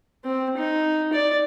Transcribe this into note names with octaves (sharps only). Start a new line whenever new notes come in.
C4
D#4
D5